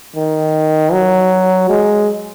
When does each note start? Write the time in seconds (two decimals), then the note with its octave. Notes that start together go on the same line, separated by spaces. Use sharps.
0.16 D#3
0.92 F#3
1.69 G#3